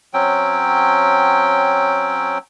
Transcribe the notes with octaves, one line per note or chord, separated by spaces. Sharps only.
F#3 C4 C#4 G5